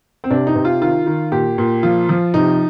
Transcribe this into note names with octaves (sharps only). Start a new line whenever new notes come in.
C4
C3 D4
D#4
C3
F4
D#3 F4
D#3
A#2 G4
A#2
F3 F4
F3
C3 D#4